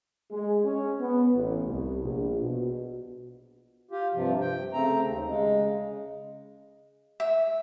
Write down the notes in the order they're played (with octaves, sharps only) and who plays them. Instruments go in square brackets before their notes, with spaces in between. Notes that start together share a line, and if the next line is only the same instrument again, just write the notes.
[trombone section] G#3
C#4
B3
A1
C2
A#1
B2
[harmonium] F4 G4
G2 C3 F3
G5
C#3 A3 C4 A#5
D#2
C#3 G#3
[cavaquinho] E5